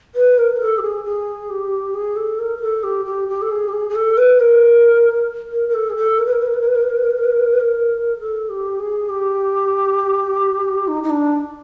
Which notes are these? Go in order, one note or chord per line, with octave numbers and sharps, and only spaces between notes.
B4
A#4
A#4
A4
G4
G#4
G#4
G4
G#4
A4
A#4
A#4
A4
G4
G4
G4
A4
G#4
G4
G#4
G#4
A4
B4
A#4
A#4
A#4
A4
G#4
A4
A#4
B4
A#4
B4
A#4
B4
A#4
B4
A#4
B4
A#4
B4
A#4
B4
A#4
B4
A#4
B4
A#4
B4
A#4
A4
G4
G#4
G4
D#4
D#4
D4